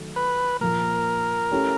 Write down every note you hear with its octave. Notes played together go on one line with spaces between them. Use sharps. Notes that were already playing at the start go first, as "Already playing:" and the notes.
Already playing: D#3 F#3 A3
B4
A#2 F3 A#3 A#4
A3 C#4 E4 G4